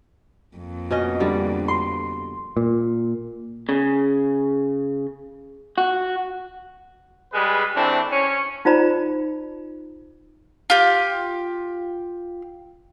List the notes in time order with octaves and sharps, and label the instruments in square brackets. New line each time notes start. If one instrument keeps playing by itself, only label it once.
[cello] F2 A#3
[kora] B2 C#4 D#5
D3 G3 D5
[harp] C6
[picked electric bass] A#2
[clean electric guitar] C#3
F#4
[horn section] G3 G#3 G#4 B4
E3 A3 C4 D4
C#4
[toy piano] D#4 F4 C5 D5 A#5 B5
[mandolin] F4 G4